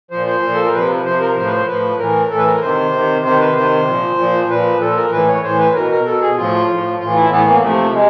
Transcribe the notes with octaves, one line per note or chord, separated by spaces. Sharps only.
A#2 F3 C5
C5
A#2 F3
A4
A#4
C3 F3 B4
C3 F3 C5
A#4
A2 F3 C5
B4
C5
A2 F3 B4
A2 E3 A#4
A2 E3 A4
B4
A#4
C3 D#3 C5
C3 D#3
C3 D#3 C5
B4
C3 D#3 C5
A#2 F3
A#2 F3
A#2 F3 B4
A#2 F3 A4
A#4
A2 E3 B4
C#5
A2 E3 C5
B4
B2 A#4
A#4
B2 A4
G#4
A2 F3 F4
A2 F3
A2 E3 F4
E4
A2 E3 B3
A#3
C3 F3 A3
C3 G#3